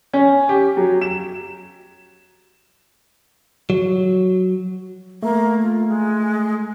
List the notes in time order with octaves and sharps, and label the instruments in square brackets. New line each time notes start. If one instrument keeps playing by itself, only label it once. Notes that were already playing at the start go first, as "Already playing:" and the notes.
[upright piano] C#4
G4
F#3
E7
[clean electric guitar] F#3
[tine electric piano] A3 [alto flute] A#3
[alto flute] F4
G#3